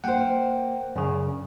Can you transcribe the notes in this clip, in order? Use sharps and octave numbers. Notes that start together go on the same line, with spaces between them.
A#3 A#4 C5 F#5 G5
F#2 C#3 D4